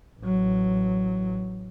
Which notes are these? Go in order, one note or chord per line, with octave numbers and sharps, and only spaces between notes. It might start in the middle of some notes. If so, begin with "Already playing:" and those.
A1 F#3